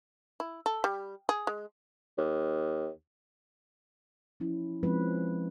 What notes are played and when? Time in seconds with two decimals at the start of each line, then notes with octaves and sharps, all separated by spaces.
0.40 E4
0.66 A4
0.84 G3
1.29 G#4
1.47 G#3
2.18 D#2
4.40 F3 C#4 E4
4.83 F3 G#3 C4 C#4 B4